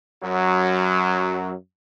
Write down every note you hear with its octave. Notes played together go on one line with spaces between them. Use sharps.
F#2 F#3